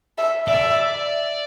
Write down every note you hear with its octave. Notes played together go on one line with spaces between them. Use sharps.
E5
D5 E5